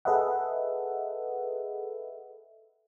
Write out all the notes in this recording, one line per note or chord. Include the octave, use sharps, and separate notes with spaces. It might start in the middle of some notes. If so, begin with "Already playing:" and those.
G#4 A4 B4 D#5 E5 F#5